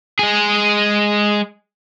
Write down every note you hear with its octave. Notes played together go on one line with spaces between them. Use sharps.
G#3 G#4